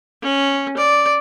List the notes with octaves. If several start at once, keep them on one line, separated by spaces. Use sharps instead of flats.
C#4
D5